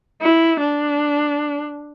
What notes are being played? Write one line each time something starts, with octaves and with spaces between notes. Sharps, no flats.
E4
D4